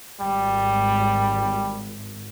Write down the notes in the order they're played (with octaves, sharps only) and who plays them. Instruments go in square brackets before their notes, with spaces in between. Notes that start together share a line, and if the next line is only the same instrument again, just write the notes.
[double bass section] G#1 [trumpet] G3